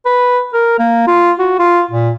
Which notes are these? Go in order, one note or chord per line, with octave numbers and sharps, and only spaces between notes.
B4
A#4
A#3
F4
F#4
F4
A#2